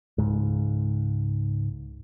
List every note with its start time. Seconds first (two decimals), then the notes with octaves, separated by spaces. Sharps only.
0.18 C#2 G#2